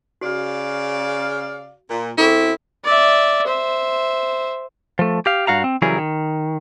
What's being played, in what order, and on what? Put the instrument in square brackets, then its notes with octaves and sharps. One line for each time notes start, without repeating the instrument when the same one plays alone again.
[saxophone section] C#3 D5 F5 [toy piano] F#4
[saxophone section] A#2
[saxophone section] F#2 C4 [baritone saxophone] E4 [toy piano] G#4 A4 C#6
[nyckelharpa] D5 E5
C5 E5
[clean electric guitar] F3 A3
G4 F5
G2 F#4 F5 A#5
C4
C#3 E3 F#3 G3 G#4 A#4
D#3